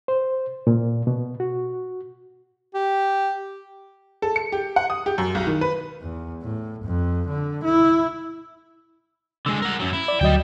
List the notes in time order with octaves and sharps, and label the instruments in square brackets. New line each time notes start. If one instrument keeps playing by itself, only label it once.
[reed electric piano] C5
A#2
B2
F#4
[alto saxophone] G4
[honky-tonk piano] A4
C#7
G4
F#5
D#6
G4
F#2
B1
D#3
B4
[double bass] E2
A2
F2
D3
E4
[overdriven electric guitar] D3 G#3 [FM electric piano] E6
[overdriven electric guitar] A#4 F#5
F#2 F#3
E4
[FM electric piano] D5
[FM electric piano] D2 F#3 D#5 [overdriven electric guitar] G3 G5